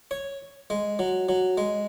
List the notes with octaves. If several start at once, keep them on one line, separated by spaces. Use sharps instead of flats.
C#5
G#3
F#3
F#3
G#3